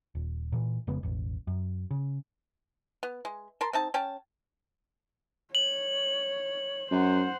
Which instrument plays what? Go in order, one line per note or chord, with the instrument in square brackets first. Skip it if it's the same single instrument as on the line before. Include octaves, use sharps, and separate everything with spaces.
[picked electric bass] D#1
A#2 E3
F1 C#3 G#3 B3
E1 A1
F#2
C#3
[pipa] B3
G#3
A#4 A5 C6
C4 D#4 A5
C#4 G5 A5
[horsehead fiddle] C#5 [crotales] F#7
[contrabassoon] F#2 [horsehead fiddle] C5 F#5